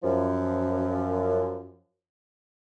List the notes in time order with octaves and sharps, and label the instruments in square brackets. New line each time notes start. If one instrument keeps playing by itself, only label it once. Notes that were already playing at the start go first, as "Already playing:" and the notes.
[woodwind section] F#2 F3